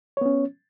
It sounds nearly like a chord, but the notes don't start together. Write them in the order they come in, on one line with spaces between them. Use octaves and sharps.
C#5 B3 C#4